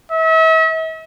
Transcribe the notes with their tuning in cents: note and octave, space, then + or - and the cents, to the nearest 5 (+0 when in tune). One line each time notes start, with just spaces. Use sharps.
E5 -40